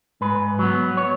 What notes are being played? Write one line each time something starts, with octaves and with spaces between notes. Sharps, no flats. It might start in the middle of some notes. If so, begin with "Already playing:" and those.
G#2 B4
F#3 B3
C#5